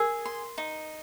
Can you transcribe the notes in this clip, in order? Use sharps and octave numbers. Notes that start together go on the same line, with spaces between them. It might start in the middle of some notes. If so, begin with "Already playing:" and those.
Already playing: G#4 A#4
C6
D#4